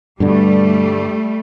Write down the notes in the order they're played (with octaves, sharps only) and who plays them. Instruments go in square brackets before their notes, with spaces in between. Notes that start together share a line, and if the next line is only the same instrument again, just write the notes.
[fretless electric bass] G2 B2 D3 [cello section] G3 A3